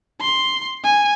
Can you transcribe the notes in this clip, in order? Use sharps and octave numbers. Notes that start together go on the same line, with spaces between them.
C6
G#5